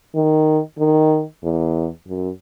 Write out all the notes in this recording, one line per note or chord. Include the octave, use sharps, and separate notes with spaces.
D#3
D#3
E2
F#2